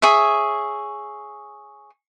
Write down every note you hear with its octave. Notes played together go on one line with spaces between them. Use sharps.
G#4 C#5 E5